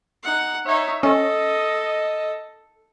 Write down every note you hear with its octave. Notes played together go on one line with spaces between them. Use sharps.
D#4 F#5
D#4 C#5 E5
C#4 A4 D#5